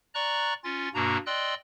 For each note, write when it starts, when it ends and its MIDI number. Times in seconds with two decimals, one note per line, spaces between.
0.14 0.54 74
0.14 0.54 82
0.14 0.54 85
0.14 0.54 90
0.64 0.89 61
0.64 0.89 65
0.64 0.89 93
0.94 1.17 43
0.94 1.17 47
0.94 1.17 58
0.94 1.17 62
0.94 1.17 66
0.94 1.17 82
1.26 1.54 74
1.26 1.54 75
1.26 1.54 79
1.26 1.54 84
1.26 1.54 88
1.26 1.54 90